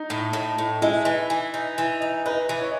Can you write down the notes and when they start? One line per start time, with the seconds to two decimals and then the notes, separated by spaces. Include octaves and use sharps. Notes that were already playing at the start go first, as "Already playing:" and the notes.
Already playing: D#4
0.10 A2
0.33 A2
0.58 A2
0.82 G#3 E4
1.05 E3
1.30 E3
1.54 D#4
1.78 E3
2.02 D#4
2.26 D#4 B4
2.49 E3
2.61 C#5